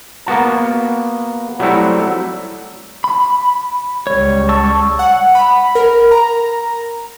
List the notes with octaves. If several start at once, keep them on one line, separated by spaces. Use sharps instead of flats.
A#3 B3 F#4 A5
F#3 G3 A3 C4 E4 F#4
B5
C#2 G3 C#5
A5 C#6 E6
F#5
B5
A#4
A#5